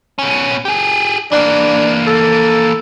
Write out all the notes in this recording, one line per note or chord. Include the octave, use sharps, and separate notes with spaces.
B2 C#4
G4 G#4
E3 A#3 D4
A4